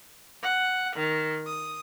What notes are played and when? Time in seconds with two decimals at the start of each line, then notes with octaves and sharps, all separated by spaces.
0.43 F#5
0.96 D#3
1.46 D#6